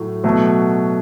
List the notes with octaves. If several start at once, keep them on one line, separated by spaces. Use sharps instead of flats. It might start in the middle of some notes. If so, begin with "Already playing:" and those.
Already playing: A2 F#3 A3
B2 F#3 A3